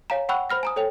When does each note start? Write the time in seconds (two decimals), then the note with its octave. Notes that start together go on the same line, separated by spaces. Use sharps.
0.10 C#5 F5 G#5 A#5
0.29 F#5 G5 B5 C#6 E6 F#6
0.50 C5 B5 F6 A#6
0.63 G#5 A#5 D#6
0.76 A4 C#5 G5 F7